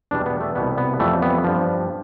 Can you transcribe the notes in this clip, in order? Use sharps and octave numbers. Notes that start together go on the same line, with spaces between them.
E2 B2 G3 D4
B3
A3
C2 B2 G3 B3
B3
F2 E3 G3 A3
B3
G2 F3